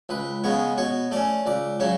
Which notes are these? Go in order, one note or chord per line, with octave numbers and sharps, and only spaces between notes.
C#2 B4
C#3 G#3 B3 C#5
B2 C#5
A3 C#4 D5
C#2 D5
C#3 F#3 C#5